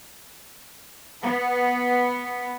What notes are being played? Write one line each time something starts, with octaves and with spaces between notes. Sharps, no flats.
B3